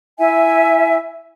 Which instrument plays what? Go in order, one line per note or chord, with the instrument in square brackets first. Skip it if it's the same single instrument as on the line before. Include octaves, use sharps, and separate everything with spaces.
[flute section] E4 E5 G#5